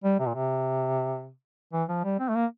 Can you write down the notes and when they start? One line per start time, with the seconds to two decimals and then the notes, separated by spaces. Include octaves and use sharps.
0.04 G3
0.19 C3
0.27 A#2
0.35 C3
1.73 E3
1.89 F3
2.04 G3
2.20 C4
2.29 A3
2.35 A#3